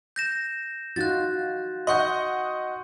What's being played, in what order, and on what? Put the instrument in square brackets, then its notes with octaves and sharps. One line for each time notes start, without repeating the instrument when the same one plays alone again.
[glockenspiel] G6 A#6 E7
[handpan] D#4 F4 F#4 [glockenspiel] F#6 A6
[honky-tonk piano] D#5 F#5 [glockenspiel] C6 C#6 G6